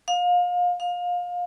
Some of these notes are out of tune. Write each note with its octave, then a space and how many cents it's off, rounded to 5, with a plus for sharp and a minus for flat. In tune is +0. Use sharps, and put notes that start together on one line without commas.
F5 +30
F5 +25